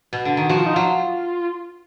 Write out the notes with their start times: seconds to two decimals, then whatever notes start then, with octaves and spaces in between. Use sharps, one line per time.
0.13 B2
0.25 D3
0.37 D#3
0.49 F3 F#4
0.58 F4
0.66 D#4
0.74 F#3 F4